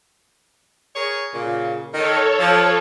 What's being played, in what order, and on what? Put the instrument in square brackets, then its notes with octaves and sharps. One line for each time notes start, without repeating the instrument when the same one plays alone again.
[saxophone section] G#4 A#4 C#5
A#2 C#3
[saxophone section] D#3 [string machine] A4 C#5
[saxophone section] F3